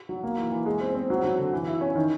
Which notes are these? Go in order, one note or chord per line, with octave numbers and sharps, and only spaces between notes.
F#3
A#3
E3
E3
G#3
C4
C4
F#3
F#3
D3
E3
E4
C#4
D#3